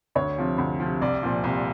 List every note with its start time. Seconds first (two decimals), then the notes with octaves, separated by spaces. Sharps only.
0.15 D2 C#5
0.37 C3 F3
0.58 D2
0.80 C3 F3
1.02 C2 D5
1.23 A#2 F3
1.44 C2